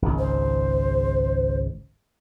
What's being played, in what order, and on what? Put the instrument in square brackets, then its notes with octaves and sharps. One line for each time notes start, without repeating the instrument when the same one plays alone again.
[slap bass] G#1 C#2
[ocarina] C5